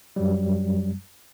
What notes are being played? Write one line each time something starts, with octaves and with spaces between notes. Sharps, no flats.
F#2 F#3 G3